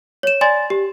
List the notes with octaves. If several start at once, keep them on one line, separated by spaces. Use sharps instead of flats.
C#5 E7
D5 G#5 C6 A6
G4